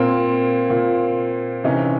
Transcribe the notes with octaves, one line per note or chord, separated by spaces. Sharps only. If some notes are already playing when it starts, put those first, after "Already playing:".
Already playing: A#2 A#3 C4
A#2
C3 E3 C#4 D#4